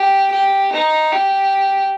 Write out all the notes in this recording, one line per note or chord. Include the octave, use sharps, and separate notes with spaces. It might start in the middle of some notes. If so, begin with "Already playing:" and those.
Already playing: G4
G4
D#4
G4